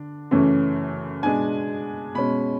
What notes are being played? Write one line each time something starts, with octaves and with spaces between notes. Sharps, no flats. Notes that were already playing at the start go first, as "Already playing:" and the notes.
Already playing: D3 D4
F#2 C#3 E3 A3 C#4
B2 G#3 B3 D4 G#5
B2 G#3 C#4 B5